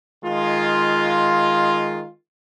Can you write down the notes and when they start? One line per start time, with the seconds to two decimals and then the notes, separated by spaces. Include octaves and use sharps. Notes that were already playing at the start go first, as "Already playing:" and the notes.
0.24 D#3 G#3 F4